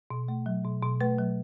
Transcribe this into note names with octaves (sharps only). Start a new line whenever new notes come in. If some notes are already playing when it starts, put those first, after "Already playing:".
B2
A3
F#3
B2
B2
A3 B4
F#3